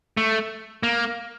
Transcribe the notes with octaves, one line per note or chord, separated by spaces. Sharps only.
A3
A#3